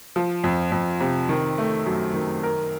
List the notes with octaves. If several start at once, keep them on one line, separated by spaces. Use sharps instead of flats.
F3
F2
F2
C3
D#3
A3
F#2
D#3
A#4